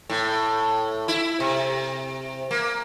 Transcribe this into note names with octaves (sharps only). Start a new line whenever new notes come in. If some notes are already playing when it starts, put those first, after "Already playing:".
A2
E4
C3
A#3